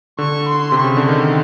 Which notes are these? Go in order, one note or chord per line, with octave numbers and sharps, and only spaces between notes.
D3 C#6
C6
C3
C#3 C#6
D3
D#3 C6